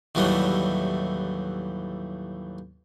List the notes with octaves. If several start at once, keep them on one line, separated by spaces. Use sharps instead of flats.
D#2 A2 E3 F#3 G3 A3